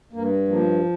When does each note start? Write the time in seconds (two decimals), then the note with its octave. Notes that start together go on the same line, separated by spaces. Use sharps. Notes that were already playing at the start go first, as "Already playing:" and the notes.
0.13 G2 A#3
0.47 F3 A#3